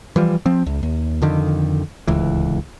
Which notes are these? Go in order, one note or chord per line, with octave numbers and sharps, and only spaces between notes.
E3 F3 G3
F3 C4
C#2
D#2
F2 D3 D#3
D1 C#2 E3